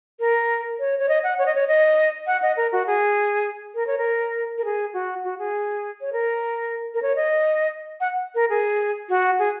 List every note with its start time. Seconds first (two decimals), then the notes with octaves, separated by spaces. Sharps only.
0.20 A#4
0.80 C#5
0.99 C#5
1.09 D#5
1.24 F#5
1.39 C#5
1.46 D#5
1.55 C#5
1.68 D#5
2.27 F#5
2.42 D#5
2.57 A#4
2.72 F#4
2.87 G#4
3.75 A#4
3.87 C#5
3.98 A#4
4.58 A#4
4.65 G#4
4.94 F#4
5.24 F#4
5.39 G#4
6.01 C#5
6.13 A#4
6.94 A#4
7.02 C#5
7.16 D#5
8.01 F#5
8.35 A#4
8.50 G#4
9.10 F#4
9.39 G#4